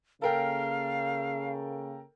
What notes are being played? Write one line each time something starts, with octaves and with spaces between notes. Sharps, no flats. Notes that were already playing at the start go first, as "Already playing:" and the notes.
C#3 A#3 A4 A#4 F5 G5